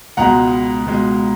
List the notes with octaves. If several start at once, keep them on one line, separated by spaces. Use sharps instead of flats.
C#2 B2 G#3 F#5 A#5
C#2 B2 G#3